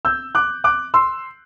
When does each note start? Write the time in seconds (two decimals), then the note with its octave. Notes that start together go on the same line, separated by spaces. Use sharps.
0.05 E6 G6
0.35 D6 F#6
0.64 D6 F#6
0.94 C6 E6